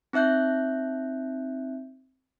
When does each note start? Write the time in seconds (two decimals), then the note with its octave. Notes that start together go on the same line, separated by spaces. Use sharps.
0.13 C4 D#4 E5 F#6 G6